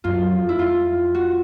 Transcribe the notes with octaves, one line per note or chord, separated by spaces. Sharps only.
F#2 F4
F2
E4
F2 F4
F#4